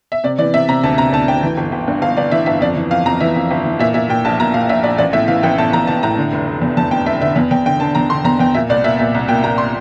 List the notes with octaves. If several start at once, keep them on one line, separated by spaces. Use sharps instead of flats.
E5
C3 D5
E3 D5
C3 E5
C3 A#5
D2 A5
C3 A#5
D2 A5
D2 G5
E3
G1
G1
G2
G1 F5
G1 D5
E3 E5
G1 E5
F2 D5
E3
F2 F5
F2 A#5
E3 E5
F2
G1
E3
A#2 E5
A#2 E5
A#2 G5
A#1 A5
A#2 A#5
A#2 F5
A#1 E5
A#1 D5
A1 D5
A2 E5
E3 F5
A1 G5
A2 A5
A1 A#5
E3 A5
A2 A#5
D3
F1
F1
E2
E2 A5
F1 G5
F1 E5
D3 E5
E2
E2 G5
D3 G5
D3 A5
E2 A#5
D3 C6
E2 A#5
E2 G5
A#2 E5
C2 D5
A#2 E5
A#2 E5
C2
A#2 G5
A#2 A#5
C6